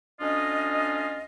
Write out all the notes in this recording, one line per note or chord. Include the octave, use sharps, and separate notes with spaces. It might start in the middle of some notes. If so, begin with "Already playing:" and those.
D2 C#4 D4 F4 D#5